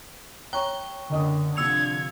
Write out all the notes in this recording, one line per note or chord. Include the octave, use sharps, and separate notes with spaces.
C#5 G5 A#5 C#6 F#6
F#1 D3 D#5 D#6
C3 F3 E6 G#6 C#7 F7